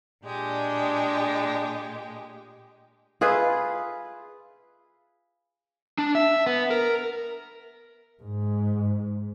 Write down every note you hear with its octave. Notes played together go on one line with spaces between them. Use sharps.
A#2 G#3 D4 G4
F4 G#4 B4 E5
D4
E5
B3
A#4
G#2